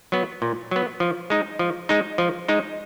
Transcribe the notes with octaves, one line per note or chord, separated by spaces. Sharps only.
F#3 B3
A#2
F#3 B3
F3
G#3 D#4
F3
G#3 D#4
F3
G#3 D#4